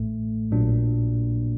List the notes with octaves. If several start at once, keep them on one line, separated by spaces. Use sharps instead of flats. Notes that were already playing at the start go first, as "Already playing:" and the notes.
Already playing: A1 A2 A3
A#1 A#2 F#3 A#3 D4